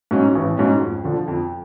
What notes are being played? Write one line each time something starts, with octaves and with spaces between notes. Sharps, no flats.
G#2 F#3 C#4
A1
G#2 F#3 C#4
F2
D3 F3
F2